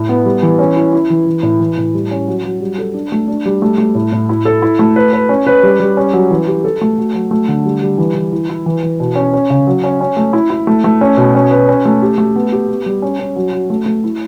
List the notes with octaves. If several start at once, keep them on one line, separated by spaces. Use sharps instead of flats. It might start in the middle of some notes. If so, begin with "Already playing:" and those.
Already playing: A2
B3
G3
E3
C#4
E4
E4
E3
E3
A2
E3
A2
G3
C#4
F#3
F#3
G3
A4
D4
A3
D4
G3
A3
A3
A2
A2
E4
A4
E4
A3
B4
B4
C#4
B4
G3
G3
C#4
F#3
E3
G4
A4
A3
F#4
F#3
A3
D3
G3
G3
E3
E3
E4
E4
E3
E3
B2
C#4
C#4
C#3
F#3
C#4
C#4
A3
E4
E4
A3
A3
C#4
B2
C#4
B4
C#4
A3
G4
A3
B3
G4
B3
G3
C#4
C#4
F#3
F#4
A3
A3
E4